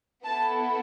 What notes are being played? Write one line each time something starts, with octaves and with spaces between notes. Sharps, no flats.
B3 E4 A4 A5